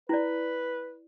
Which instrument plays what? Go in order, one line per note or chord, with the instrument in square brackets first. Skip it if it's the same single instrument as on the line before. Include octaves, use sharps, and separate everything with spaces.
[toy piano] E4 D5 [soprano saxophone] B4